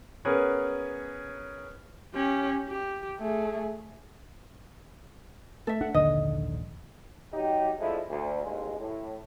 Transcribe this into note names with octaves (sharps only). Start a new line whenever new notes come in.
B3 C#4 G#4 A#4 B4 C#5
C#4 G4
G4
A3 G#4
A3 A4 E5
D4 F#5
A#1 D#2 G#2 D3 D#5
F#3 D#4 G4
F3 G#3 A3 D4 E4
D2
A1 D#2 G#3
A2